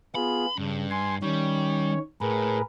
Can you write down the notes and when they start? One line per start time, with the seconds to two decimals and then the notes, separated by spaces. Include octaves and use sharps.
0.15 B3 F4 G#4 B5
0.58 G2 C#3
0.91 G#5 C6
1.23 D#3 G3 C#4 C#5
2.21 A2 G#4 A#4 B4